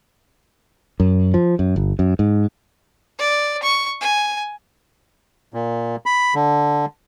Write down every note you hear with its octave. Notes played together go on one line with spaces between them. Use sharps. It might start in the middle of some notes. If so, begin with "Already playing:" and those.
F#2
F3
F#2
G1
F#2
G#2
D5
C#6
G#5
A#2
B5
D3